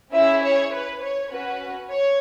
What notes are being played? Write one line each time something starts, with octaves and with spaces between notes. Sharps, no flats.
C#4 E4 G#4 E5
C#5
B4
C#5
C#4 F#4 B4
C#5